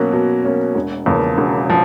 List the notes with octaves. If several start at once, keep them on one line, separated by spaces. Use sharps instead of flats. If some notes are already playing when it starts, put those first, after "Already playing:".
Already playing: B2 F#3 A#3 C#4
B2
F#3 A#3 C#4
E1
E2 C#3 F3 A#3
E1
F3